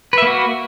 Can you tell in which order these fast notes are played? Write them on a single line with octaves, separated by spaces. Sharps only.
B4 E5 A#3 F#4